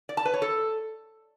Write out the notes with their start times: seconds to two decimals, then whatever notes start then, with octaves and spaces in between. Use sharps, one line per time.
0.09 D5
0.17 A5
0.25 B4
0.34 C#5
0.42 A4